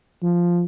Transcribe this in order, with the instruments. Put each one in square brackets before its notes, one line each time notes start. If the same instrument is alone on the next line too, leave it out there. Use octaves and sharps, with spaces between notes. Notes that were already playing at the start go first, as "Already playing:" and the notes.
[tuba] F3